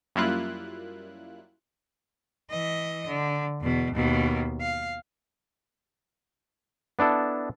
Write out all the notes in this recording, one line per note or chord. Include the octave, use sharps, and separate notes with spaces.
F#2 G3 A#3 E4 F4 F#6
E3 D#5
D3
E2 B2
D#2 B2
F5
B3 D4 E4 A4